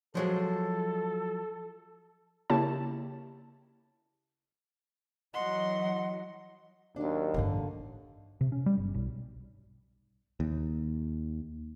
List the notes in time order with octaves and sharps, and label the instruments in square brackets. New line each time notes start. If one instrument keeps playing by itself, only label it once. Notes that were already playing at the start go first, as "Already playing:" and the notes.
[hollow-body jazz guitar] F3 F#3 G#3 [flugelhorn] A4
[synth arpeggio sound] C#3 A#3 E4 G4 C#5 A5
[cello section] E3 F#3 [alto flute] D#5 [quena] F#5 [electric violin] C6
[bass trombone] D#2 [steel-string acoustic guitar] F#3 D4
[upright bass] A1 G2 [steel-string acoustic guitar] D3 F5
[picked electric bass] C3
C#4
G3
G1
B1
D#2